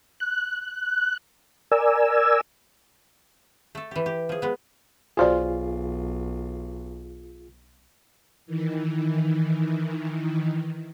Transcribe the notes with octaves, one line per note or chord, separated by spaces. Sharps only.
F#6
A#4 D5 G#5 E6
A3 A4
E3 G4
G4
F3 G#4
G#3 B3
B1 F4 F#4 G#4 C5 D5
D#3 E3